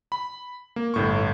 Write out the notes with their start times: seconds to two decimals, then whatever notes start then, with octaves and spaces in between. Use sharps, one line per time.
0.12 B5
0.76 A#3
0.94 G1 A2 C#6